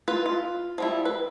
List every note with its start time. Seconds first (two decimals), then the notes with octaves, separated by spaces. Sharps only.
0.08 F4 B4
0.26 F4
0.78 F3 G3 E4
1.05 B4